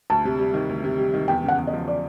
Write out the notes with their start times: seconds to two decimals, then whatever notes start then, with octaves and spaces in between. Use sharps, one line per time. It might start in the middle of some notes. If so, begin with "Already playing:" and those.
0.10 D2 A5
0.25 C3
0.39 G3
0.54 D#3
0.69 D2
0.84 C3
0.98 G3
1.14 D#3
1.28 E2 G5
1.44 C#3 F#5
1.58 E2
1.67 D#5
1.73 F3
1.88 D5